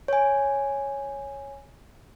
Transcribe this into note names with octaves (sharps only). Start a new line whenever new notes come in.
C#5 G#5